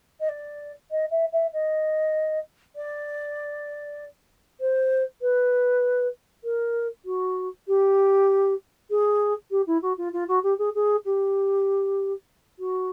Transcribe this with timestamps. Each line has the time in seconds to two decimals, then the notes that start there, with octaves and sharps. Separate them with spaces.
0.20 D#5
0.29 D5
0.91 D#5
1.11 E5
1.32 E5
1.53 D#5
2.75 D5
4.60 C5
5.21 B4
6.44 A#4
7.05 F#4
7.67 G4
8.90 G#4
9.51 G4
9.67 E4
9.82 F#4
9.97 F4
10.13 F4
10.28 F#4
10.43 G4
10.58 G#4
10.74 G#4
11.05 G4
12.59 F#4